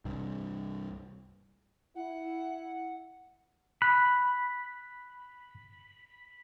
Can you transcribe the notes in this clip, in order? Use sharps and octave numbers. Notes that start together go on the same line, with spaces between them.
C2 G2
E4 F#5
B5 F#6